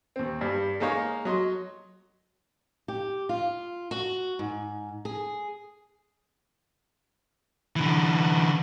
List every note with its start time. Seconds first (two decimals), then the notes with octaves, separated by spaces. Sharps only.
0.16 D#2 C4
0.41 G2 G3
0.80 G#3 A#3 D#4 C#5 F5
1.25 F#3 D#5 C6
2.88 G4
3.29 F4
3.91 F#4
4.39 G#2
5.05 G#4
7.76 D3 E3